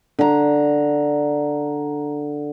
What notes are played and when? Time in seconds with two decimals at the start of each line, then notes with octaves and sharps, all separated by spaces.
0.19 D3 A#5